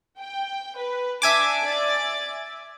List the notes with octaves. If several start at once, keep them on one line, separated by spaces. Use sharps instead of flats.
G5
B4
D4 E5 G#5 A5 D6
D5 A6